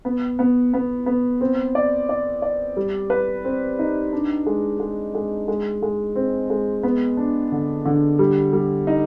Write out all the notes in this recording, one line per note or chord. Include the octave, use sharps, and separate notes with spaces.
B3
B3
B3
B3
C4
D5
D5
D5
G3
B4
C4
D#4
D4
G#3
G#3
G#3
G#3
G#3
C4
G#3
B3
D4
D3
D3
G3
G3
D#4